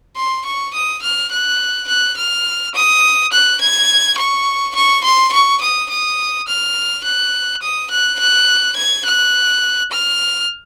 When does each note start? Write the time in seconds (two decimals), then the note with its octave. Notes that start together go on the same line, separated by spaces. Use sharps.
0.16 C6
0.45 C#6
0.74 D#6
1.02 F6
1.31 F#6
1.88 F#6
2.17 F6
2.75 D#6
3.32 F#6
3.61 G#6
4.18 C#6
4.75 C#6
5.04 C6
5.33 C#6
5.61 D#6
5.90 D#6
6.48 F6
7.04 F#6
7.62 D#6
7.91 F#6
8.19 F#6
8.77 G#6
9.05 F#6
9.91 F6